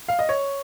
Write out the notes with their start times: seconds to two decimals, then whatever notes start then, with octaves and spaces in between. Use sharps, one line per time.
0.08 F5
0.19 D#5
0.29 C#5